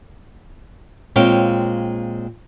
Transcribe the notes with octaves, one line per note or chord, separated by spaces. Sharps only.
A#2 G#3 C4 C#5 F5 G5